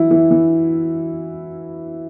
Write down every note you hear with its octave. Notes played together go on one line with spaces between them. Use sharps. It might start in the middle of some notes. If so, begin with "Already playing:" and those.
Already playing: E3 F#3 E4
E3 E4
E3